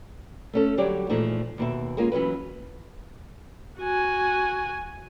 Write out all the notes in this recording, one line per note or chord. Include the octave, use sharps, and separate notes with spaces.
A3 C#4 A4
D3 F#3 G3 G4 C#5 D5
A#2 E3 F3 G#3 A3 D#4
D#2 B2 E5
G#3 A#3 C#4 F4
E3 F#3 C#4 B4
F#4 G#5